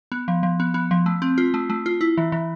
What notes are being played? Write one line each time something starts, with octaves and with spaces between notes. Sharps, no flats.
B3
F3
F3
B3
B3
F3
A3
C4
F4
A3
A3
F4
E4
E3
E3